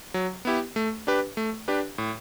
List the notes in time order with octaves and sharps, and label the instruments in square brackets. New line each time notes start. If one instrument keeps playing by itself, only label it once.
[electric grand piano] F#3
B3 E4 G4
A3
D4 G4 B4
A3
D4 G4 B4
A2